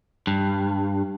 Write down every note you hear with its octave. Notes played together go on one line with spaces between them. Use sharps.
G2